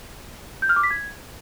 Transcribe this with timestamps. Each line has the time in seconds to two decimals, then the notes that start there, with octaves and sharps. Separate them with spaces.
0.62 G6
0.69 F6
0.76 D6
0.83 B6
0.91 G#6